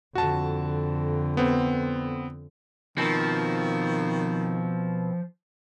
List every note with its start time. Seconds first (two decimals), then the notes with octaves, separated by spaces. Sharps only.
0.15 F2 D3 F#4 A5
1.37 B3 C4
2.98 B2 D#3 F3 C4